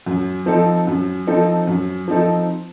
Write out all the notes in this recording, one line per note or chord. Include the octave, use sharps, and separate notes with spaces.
F#2
F3 C4 D#4 A4
F#2
F3 C4 D#4 A4
F#2
F3 C4 D#4 A4